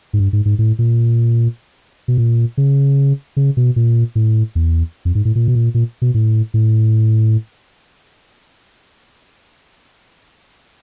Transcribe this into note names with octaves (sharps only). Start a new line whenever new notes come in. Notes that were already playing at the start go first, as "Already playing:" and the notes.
G#2
G2
G#2
G#2
A2
A#2
B2
A#2
C#3
C#3
B2
A#2
A2
E2
F2
G#2
A2
A#2
B2
A#2
A#2
B2
A2
A2